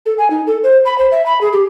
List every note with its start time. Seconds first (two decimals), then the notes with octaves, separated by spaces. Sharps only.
0.06 A4
0.18 G#5
0.30 D#4
0.47 A4
0.63 C5
0.85 B5
0.98 C5
1.11 E5
1.26 B5
1.41 G#4
1.53 G4